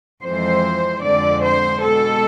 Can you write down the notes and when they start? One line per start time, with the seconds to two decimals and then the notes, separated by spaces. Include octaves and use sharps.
0.24 F2 E3 G#3 C5
1.04 F2 D3 G#3 D5
1.44 C5
1.83 B2 G#3 A4